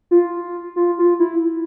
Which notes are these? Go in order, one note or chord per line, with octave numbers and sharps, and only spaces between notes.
F4
F4
F4
E4